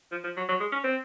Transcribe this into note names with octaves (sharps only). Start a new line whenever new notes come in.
F3
F3
F#3
F#3
G#3
C#4
C4